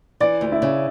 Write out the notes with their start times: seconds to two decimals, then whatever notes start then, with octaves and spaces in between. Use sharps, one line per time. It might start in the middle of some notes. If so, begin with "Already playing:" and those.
0.20 E3 D5
0.41 D2
0.52 E4
0.62 C#3